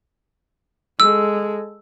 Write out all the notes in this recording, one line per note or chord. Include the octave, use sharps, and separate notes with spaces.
G#3 A4 E6